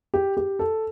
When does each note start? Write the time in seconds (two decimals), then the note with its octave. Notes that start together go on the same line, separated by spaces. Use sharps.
0.14 G4
0.37 G4
0.59 A4